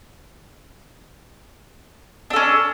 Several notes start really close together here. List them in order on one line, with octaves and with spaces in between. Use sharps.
D4 A4 C#4